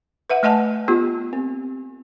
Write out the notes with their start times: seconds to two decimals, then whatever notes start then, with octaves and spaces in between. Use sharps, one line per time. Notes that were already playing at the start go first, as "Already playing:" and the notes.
0.30 B4 E5 F#5
0.43 A3 D#5 F#5 G#5 A5
0.88 B3 F4 G4
1.33 C4